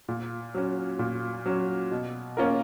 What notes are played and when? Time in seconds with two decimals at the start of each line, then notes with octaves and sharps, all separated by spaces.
0.08 A#2
0.54 F#3 C#4
0.99 A#2
1.46 F#3 C#4
1.91 B2
2.37 A#3 C#4 F4 A#4